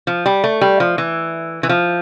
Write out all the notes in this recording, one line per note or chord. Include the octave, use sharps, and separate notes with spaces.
F3
G3
A3
G3
F3
E3
E3
F3